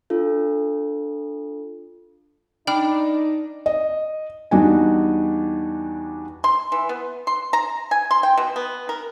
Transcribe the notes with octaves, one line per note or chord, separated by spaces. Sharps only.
D4 F4 A4
D4 D#4 G5 B5 F6
D#5
E2 G3 D4 D#4 F#4 G#5
C6
E3
B3
C6
A#5
G#5
C6
G5
B2
B3
A#4